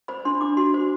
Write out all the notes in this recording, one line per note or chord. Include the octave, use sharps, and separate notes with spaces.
C5 B5
D4 C6
D4 D6
F#4 C6
C5